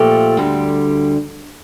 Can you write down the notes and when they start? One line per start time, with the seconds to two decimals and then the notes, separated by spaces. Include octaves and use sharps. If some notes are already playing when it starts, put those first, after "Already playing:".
Already playing: A#2 F3 A3 G4
0.37 D2 D3 G3